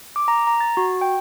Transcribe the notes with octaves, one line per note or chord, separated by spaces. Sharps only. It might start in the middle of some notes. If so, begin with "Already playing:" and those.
D6
A#5
A#5
A6
F#4
G5